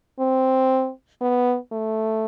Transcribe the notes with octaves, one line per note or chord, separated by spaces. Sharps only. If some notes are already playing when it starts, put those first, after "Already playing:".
C4
B3
A3